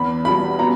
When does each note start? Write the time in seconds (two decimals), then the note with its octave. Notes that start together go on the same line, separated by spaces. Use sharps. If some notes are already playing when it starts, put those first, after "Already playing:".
Already playing: E2 B5
0.25 B2 G3 B5
0.59 B2 A#5